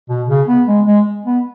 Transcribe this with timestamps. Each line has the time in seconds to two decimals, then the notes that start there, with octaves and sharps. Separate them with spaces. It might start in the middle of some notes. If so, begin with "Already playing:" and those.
0.09 B2
0.29 C#3
0.48 B3
0.68 G#3
0.86 G#3
1.25 B3